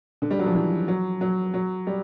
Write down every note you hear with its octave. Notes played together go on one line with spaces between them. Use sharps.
D3
G3
F#3
F3
E3
F#3
F#3
F#3
G3